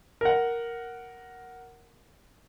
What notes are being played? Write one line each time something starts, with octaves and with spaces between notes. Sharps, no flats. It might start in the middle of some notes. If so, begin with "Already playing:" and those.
A#4 F#5